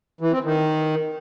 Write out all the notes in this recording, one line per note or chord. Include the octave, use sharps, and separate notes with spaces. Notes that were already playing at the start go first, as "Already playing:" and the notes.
E3
C4
D#3